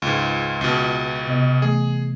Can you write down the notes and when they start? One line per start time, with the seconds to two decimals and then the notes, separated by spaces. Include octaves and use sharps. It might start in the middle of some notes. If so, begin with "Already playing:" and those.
0.02 C#2 G#2
0.61 C#2 B2
1.28 C3 B3 D#5
1.62 E3 A3 G#4